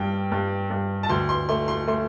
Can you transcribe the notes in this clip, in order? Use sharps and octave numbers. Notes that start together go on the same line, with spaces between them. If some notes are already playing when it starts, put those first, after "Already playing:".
Already playing: G2 G3 G5
G2
G2
A5
D2 C6
C6
A3 C6
C6
A3 C6